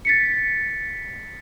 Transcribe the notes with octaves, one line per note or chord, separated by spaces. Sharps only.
A6 B6 C#7